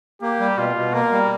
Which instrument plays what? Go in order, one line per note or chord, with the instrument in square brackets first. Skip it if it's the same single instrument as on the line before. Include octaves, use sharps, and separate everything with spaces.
[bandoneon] A#3 [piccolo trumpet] G4
[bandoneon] G3
[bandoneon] B2 [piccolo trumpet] F4
[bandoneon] B2
[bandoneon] A#3 [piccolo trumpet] A#4
[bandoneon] G3